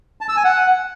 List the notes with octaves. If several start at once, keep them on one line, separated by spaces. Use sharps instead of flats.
A5
E6
G#5
F#5